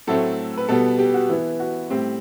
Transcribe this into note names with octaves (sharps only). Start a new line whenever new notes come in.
A2 F#3 A3 C4 A4
B4
B2 G3 B3 A4
G4
F#4
E3 B3 E4
F#4
A2 G3 C4 G4